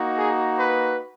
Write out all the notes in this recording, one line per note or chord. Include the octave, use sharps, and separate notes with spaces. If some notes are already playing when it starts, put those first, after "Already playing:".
Already playing: A#3 D#4 F#4
G#4
B4